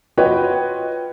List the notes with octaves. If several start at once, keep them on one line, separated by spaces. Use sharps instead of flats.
F4 F#4 B4 C#5 D#5 G5